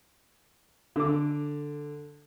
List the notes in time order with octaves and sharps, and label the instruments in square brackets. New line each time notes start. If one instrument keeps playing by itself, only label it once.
[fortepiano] D3 D6